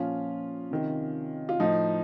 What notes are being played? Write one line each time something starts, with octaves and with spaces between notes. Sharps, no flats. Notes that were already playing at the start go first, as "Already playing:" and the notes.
Already playing: A#2 F3 C#4 F4
C3 D#3
F4
A2 F3 D#4